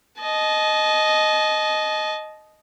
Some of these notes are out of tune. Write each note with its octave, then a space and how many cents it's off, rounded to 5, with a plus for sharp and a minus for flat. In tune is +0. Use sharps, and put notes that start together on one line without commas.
D#5 +0 A5 -35